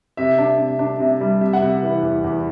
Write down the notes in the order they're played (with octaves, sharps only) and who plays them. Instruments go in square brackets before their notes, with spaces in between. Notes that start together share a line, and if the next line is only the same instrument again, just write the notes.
[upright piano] C3 E5
D4
C3
D4
C3
G3
C3 E5
F#5
C3 E5
E3
E2
E2